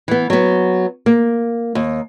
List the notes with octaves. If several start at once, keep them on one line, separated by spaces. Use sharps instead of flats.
E3 B3
F#3 B3
A#3
D#2